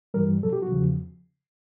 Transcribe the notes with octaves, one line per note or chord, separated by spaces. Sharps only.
G2 E3 G3 A#4
B2 F#3 A4
G4
F#4
E2 C#3 F3